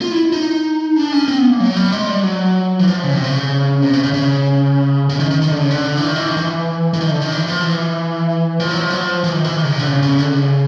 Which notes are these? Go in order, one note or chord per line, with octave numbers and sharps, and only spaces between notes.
F4
E4
D#4
D4
C#4
C4
B3
A#3
F#3
G3
G#3
G3
F#3
E3
F3
C#3
C3
C#3
C3
C#3
C#3
C#3
C#3
D#3
D#3
D#3
D3
C#3
D3
E3
D#3
E3
D#3
E3
E3
D#3
D3
D#3
E3
F3
E3
F3
F#3
F3
F#3
F3
E3
D#3
E3
D#3
C#3
C3
D3
C#3
C#3
D3
C#3